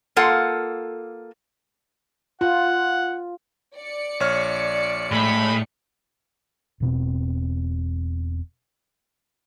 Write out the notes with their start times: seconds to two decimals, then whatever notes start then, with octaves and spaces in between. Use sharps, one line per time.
0.16 A#3 F4 A4 F#5
2.41 F4 F#5
3.76 D5 C#7
4.20 A#1 C#5 F6
5.12 A2 G#3 B5
6.80 E1 B2 C4